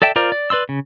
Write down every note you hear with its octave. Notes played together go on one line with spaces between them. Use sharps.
A4 D5 E5 G5 A5
F4 A#4 C5 D5 A#5
D5
B4 D5 C6 E6
C#3